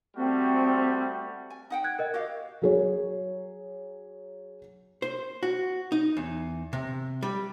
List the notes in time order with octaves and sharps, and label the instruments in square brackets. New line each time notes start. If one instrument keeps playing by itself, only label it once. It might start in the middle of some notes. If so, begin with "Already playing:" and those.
[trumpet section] G3 A3 F#4 [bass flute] C4
[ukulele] G#5
D#4 F#5 G5
[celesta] F#6 G#6
A#4 D#5
[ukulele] F#4 G4 F5
[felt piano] F#3 G#4 C#5
[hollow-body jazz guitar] C5
F#4
D#4
E2
C3
G3